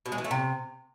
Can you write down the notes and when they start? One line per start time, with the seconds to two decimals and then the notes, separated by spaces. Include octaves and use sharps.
0.06 B2
0.12 G#3
0.18 E3
0.24 A3
0.31 C3